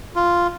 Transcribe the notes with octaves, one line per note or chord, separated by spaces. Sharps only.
F4